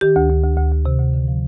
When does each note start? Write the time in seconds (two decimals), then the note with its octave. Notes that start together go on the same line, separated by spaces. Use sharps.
0.01 D#3 G4
0.16 D2
0.29 D2
0.44 D2
0.57 D2
0.72 D2
0.86 C3
1.00 D2
1.14 D3
1.28 F3